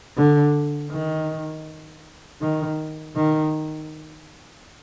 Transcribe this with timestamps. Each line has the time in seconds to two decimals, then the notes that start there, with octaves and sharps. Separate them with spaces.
0.17 D3
0.91 D#3
2.41 D#3
3.16 D#3